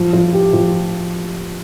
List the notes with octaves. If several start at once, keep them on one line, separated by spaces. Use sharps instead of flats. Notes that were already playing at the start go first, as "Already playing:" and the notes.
Already playing: F3
F3
G4
F3